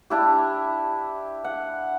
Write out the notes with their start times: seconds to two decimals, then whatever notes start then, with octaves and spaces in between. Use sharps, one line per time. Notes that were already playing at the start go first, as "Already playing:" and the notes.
0.10 D4 E4 G4
1.44 F#5